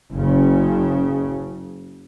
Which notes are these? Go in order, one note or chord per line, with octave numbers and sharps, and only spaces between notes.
F#1 C#3